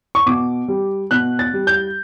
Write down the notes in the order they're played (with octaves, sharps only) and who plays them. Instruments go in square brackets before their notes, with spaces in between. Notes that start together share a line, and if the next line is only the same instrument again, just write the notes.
[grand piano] C#6
B2 D6
G3
B2 F#6
A6
G3
G6